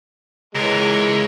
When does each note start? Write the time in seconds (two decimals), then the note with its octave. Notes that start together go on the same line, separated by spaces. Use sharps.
0.55 C#2 E3 G#3 A#4 C#5